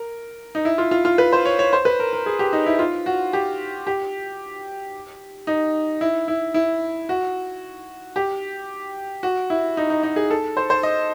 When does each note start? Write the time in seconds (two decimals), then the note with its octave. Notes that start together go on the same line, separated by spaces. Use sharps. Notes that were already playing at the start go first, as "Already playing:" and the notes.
Already playing: A#4
0.55 D#4
0.65 E4
0.78 F4
0.91 F4
1.05 F4
1.18 B4
1.32 C5
1.45 C#5
1.59 C#5
1.73 C5
1.85 B4
2.00 A#4
2.13 A#4
2.26 G#4
2.39 G4
2.53 D#4
2.66 E4
2.79 F4
3.06 F#4
3.33 G4
3.87 G4
5.47 D#4
6.01 E4
6.28 E4
6.54 E4
7.09 F#4
8.16 G4
9.23 F#4
9.50 E4
9.77 D#4
9.90 D#4
10.03 D#4
10.16 G#4
10.31 A4
10.57 C5
10.70 C5
10.83 D#5